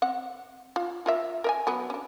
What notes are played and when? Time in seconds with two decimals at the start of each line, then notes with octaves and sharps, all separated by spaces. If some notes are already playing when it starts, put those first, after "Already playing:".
0.02 C4 F#5
0.76 F4
1.06 F4 A#4 E5
1.44 A#4 E5 G#5
1.67 F#3 B3 B4
1.90 C#4 D4